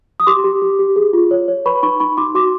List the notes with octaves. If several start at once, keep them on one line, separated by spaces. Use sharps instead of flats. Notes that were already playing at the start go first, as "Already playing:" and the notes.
D#6
G4 C6 D6
G4
G4
G4
G#4
F4
C#5
C#5
B4 B5 C#6
D#4 B5 C#6
D#4 B5 C#6
D#4 C6 D6
F#4 C6 D6